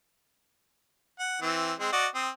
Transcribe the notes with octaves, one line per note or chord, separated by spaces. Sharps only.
F#5
E3 C4
G#3 C4
F#4 D5 D#5
C4 D#6